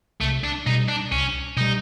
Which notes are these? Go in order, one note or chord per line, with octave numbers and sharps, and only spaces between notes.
C2 A3
D4
B2 G3 D#4
D4
C2 C#4
B2 G3 D#4